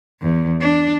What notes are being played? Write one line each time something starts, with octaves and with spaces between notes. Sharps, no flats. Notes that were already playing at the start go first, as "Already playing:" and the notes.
E2
D4